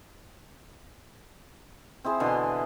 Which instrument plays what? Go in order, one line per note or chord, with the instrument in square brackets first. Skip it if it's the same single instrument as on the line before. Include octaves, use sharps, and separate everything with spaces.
[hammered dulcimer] C4 E4 G#4 C5
B2 D3 E3 C6